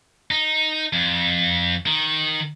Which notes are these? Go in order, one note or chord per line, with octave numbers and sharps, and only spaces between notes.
D#4
F2
D#3